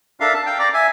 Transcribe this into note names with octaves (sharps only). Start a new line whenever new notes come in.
D4 A4 A#4 E5 F5
A5
F5 G5
D5 A#5 D6
E5 G#5